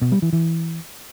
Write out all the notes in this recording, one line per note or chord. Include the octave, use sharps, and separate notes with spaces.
B2
G3
E3
E3